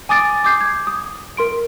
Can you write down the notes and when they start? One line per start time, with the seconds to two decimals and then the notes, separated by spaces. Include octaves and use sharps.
0.09 G#5 D6 D#6 A6 D7
0.44 D6 D#6 G6 C7
0.61 G#6
0.87 D#6
1.37 A#4 C6 D7